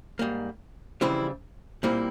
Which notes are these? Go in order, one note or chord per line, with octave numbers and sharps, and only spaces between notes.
G#2 G3 A#3
F2 C#3 E3 G3 C4 E4
A#2 G3 A#3 C4 E4